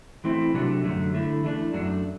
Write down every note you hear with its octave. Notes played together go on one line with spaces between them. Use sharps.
E3 A3 C4 E4
C3 F#3 A3 D4 F#4
F#2 D3 F#3 A3
D3 A3 E4
E3 A3 D4
F#2 F#3 A3 D4